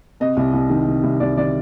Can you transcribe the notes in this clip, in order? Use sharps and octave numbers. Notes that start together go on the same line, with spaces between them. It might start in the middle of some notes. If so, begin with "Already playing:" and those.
C3 D#5
C2
C2
D#3
C3
C2
C2 D5
D#3 D5